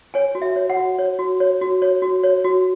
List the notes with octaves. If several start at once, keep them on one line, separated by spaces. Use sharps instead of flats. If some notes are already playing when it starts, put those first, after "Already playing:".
C#5 G#5
F#4
E5
C#5
F#5
F#4
C#5
F#4
C#5
F#4
C#5
F#4
C#5
F#4